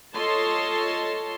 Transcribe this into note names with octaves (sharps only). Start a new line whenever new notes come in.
F4 A4 C#5 D#5 A5 C6